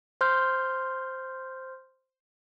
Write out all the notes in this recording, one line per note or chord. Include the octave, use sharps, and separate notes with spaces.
C5 C6 F6 G6